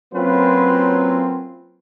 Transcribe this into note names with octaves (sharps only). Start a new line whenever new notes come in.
F#3 A#3 C4 C#4 F4 B4